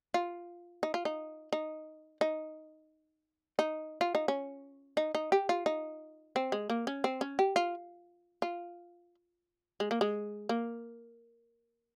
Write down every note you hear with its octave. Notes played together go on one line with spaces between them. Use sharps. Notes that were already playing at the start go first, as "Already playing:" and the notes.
F4
D#4
F4
D#4
D#4
D#4
D#4
F4
D#4
C#4
D#4
D#4
G4
F4
D#4
C4
G#3
A#3
C#4
C4
C#4
G4
F4
F4
G#3
A#3
G#3
A#3